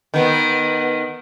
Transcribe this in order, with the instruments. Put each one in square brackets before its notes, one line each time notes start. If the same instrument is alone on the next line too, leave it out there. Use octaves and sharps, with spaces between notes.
[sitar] D#3 B3